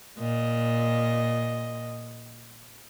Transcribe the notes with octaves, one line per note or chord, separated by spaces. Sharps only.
A#2 D#5